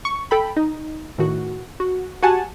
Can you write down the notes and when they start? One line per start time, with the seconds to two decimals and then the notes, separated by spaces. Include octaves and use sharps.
0.05 C#6
0.31 A4 G5 B5
0.56 D#4
1.18 A2 D#3 F#4
1.80 F#4
2.22 F#4 G4 F#5 G#5 A5